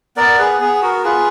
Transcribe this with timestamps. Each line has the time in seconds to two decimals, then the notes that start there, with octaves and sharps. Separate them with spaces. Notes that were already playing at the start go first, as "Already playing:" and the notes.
0.17 B3 A#4 D5
0.39 G#4 B4
0.61 B3 G#4
0.82 F#4 A#4
1.04 F4 G#4 B4